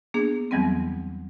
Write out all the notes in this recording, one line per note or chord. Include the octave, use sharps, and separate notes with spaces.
A#3 B3 D4 G#4
E2 E3 F#3 G3 B3 C4